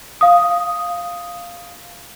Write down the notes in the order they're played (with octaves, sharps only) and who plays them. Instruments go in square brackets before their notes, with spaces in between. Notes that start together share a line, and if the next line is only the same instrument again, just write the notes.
[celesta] F5 D#6